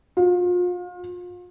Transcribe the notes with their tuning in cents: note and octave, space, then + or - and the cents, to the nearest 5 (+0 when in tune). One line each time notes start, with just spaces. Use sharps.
F4 +35